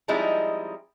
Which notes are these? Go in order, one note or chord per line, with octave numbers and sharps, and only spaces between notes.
F3 G3 G#3 C4 D#4 E4